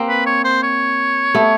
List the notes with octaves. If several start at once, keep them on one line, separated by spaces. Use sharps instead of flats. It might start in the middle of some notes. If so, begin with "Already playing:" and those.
Already playing: A#3 C4
B4
C#5
C5
C#5
A3 B3